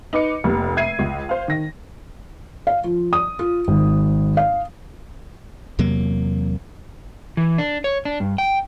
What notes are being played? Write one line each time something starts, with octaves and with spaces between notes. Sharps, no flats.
D#4 B4 D6 C#7
F1 C3 A#3
E5 G#6 C7 D#7
C#2
C5 F5
D#3 A#6
F5
F3
D#6
F4
G#1
F5
E2 C3 F#3 A#3
E3
D4
C#5
D4
G2
G5